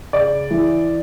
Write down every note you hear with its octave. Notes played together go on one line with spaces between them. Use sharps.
C#3 D5
E3